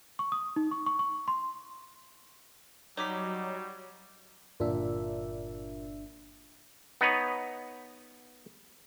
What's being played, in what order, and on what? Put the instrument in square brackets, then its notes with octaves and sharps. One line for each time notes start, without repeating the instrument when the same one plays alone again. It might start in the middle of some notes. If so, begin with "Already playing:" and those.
[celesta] C#6
D#6
D#4
C#6
C#6
C#6
C6
[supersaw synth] F#3 [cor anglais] G3 [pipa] D#4 [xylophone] C#5 D6 B6
[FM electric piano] G1 D4 E5 [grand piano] A#2
[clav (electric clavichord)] B3 D#4 B4 C#5